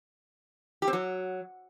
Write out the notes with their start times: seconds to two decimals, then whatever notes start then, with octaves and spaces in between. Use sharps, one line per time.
0.82 G4
0.88 C4
0.93 F#3